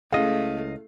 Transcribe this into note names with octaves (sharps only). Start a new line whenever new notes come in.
C#2 A3 C#4 E4 G#4 D#5 F5